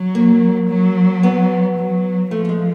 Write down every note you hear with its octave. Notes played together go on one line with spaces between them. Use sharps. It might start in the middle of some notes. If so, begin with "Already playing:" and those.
Already playing: F#3
A#3
F#3
B3
F#3
F3 A3
A3
G#3